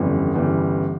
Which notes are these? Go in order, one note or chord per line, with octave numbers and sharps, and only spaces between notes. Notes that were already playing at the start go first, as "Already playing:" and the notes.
Already playing: G1 F2 C#3 E3 G3
G1 C#3 E3 G3